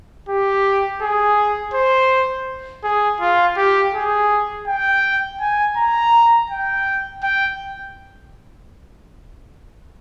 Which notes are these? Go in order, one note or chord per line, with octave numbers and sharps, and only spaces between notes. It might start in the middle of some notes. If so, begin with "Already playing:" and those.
G4
G#4
C5
G#4
F4
G4
G#4
G5
G#5
A#5
G5
G5